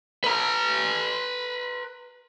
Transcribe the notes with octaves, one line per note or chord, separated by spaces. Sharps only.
B4 A#5